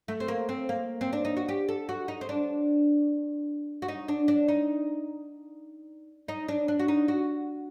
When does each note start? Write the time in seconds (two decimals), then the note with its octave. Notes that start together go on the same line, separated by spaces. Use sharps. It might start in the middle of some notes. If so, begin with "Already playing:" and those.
0.08 A3
0.20 C4
0.28 A#3
0.49 C4
0.69 A#3
1.01 C4
1.13 D4
1.25 D#4
1.37 F#4
1.48 G4
1.69 A4
1.89 F#4
2.08 D#4
2.21 C4
2.29 D4
3.82 F#4
3.88 D#4
4.08 D4
4.28 D4
4.48 D#4
6.28 D#4
6.48 D4
6.68 D4
6.79 F#4
6.88 D#4
7.08 F#4